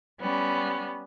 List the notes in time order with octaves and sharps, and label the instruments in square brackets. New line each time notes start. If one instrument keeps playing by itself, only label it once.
[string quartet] G3 B3 C#4